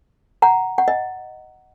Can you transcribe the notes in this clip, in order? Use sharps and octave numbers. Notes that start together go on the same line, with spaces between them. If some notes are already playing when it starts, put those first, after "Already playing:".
F#5 A#5
F#5
D#5